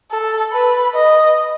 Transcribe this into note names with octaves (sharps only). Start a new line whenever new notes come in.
A4
B4
D#5